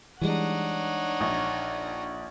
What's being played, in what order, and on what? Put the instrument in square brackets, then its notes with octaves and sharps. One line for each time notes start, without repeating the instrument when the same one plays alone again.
[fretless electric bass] E3 G3 G#3 [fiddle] D4 D#4 [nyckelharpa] C#5 F#5
[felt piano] A#1